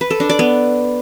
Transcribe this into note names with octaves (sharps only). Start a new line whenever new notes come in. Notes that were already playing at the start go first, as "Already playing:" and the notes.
B4
A4
D4
D5
B3